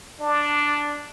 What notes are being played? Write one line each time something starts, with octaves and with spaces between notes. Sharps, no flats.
D4